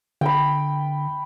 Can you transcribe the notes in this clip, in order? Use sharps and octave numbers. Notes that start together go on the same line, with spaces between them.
D3 G5 B5